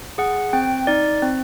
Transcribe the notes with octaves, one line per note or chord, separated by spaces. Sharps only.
G#4 F#5
C4 G5
D#4 D5
C4